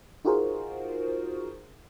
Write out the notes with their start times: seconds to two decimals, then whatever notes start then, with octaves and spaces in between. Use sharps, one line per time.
0.25 D#4 F4 F#4 G#4 A#4 C5